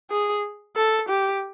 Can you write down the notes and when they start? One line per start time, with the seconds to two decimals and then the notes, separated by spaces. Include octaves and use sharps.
0.11 G#4
0.76 A4
1.09 G4